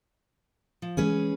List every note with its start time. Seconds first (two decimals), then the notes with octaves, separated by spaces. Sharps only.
0.82 F3
0.97 E3 F3 G#3 C#4 G#4 B4